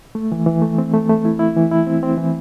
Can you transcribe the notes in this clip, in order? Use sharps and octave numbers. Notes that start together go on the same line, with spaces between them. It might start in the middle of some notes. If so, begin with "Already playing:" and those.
A3
E3
E3
A3
C4
A3
A3
E4
E4
E3
E4
C4
C4
E3